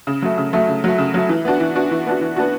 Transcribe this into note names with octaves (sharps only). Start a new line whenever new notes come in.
C#3
F#3 A3
C#3
F#3 A3
C#3
F#3 A3
C#3
F#3 A3
E3
B3 D4 F#4
E3
B3 D4 F#4
E3
B3 D4 F#4
E3
B3 D4 F#4